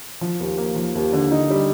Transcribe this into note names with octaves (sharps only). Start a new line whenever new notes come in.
F3
D#2
A#3
F3
D#2
D3
D#4
G3